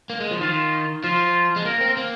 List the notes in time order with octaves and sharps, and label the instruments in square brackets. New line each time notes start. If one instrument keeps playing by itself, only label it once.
[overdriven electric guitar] A#3
G#3
F3
[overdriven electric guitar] D#3 [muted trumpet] F4
[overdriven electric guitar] F3 [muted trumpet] F4
[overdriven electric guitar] G#3
[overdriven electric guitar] A#3 [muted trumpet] A#4
[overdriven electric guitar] C4
A#3